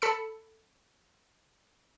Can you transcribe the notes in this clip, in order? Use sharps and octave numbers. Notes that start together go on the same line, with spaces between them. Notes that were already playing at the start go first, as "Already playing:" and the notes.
A4 B5 E6 C#7